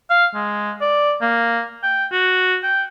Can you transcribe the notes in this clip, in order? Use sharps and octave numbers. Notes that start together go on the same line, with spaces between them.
F5
G#3
D5
A#3
G5
F#4
G5